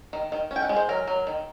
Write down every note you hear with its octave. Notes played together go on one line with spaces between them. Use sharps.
D#3
D#3
C#4
G5
F#5
G#3
C5
F#3 A#4
F#3
D#3